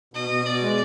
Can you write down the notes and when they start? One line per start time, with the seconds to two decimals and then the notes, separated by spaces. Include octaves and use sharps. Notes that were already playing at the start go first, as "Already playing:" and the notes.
0.14 B2 D#5
0.30 B2
0.46 B2 D5
0.61 G#3